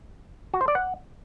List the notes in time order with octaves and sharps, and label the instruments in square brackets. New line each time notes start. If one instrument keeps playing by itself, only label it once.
[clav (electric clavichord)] F#4
C5
D5
F#5